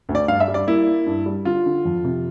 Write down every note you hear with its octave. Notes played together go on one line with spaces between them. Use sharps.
D2
D5
G2 F5
E5
G3
D5
A#3 E4
A#3
G2
G3
D3 F4
D3
F2
C3